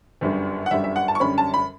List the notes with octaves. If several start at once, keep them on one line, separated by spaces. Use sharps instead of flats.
G1 F#2 D3 G3
F#5
G1 F#2 D3 G3 E5
E5
F#5
A5
C#6
F#2 D3 G3 C#4 B5
A5
B5